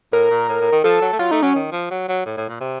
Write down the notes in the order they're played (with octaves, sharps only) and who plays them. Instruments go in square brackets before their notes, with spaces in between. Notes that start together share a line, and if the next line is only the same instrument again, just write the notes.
[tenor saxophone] A2 [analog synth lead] A#4
[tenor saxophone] A#2
A2
A2
D#3
[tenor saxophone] F3 [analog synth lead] A4
[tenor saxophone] F#3
A3
[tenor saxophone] F#3 [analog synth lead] F4
[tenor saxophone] A3 [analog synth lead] D#4
[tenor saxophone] F#3 [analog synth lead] C#4
[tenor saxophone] D#3
F3
F#3
F#3
A2
A2
A#2
C3